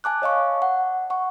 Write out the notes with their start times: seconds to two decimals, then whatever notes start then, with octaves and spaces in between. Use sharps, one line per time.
0.04 G#5 A5 D6 F#6
0.22 C#5 D#5 F5 C#6
0.62 F#5
1.10 F#5 C#6